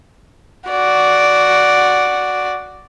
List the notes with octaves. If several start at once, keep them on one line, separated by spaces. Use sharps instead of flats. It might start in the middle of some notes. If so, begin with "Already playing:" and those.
F#4 D5